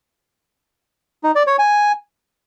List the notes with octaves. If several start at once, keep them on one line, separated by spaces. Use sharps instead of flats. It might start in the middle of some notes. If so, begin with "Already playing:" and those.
D#4
D5
C#5
G#5